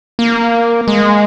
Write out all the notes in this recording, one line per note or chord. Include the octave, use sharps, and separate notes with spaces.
A#3
G#3